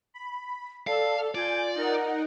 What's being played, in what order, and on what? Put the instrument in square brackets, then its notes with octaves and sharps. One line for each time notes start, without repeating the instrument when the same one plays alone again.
[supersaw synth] B5
[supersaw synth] A4 [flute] D5 [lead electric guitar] F5
[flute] F4 [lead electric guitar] D5 [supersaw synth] G#5 G6
[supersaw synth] D#4 A#4 F#5